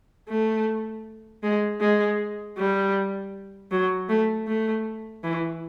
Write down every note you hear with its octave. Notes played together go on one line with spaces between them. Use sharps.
A3
G#3
G#3
G3
F#3
A3
A3
E3